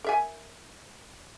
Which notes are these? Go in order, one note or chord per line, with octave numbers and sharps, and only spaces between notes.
A#4 E5 G#5